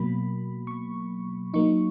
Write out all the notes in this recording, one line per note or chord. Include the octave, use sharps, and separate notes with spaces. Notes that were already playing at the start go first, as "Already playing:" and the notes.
Already playing: B2 F#3 A#3 B5
C#6
F#3 A#3 D#4 C#6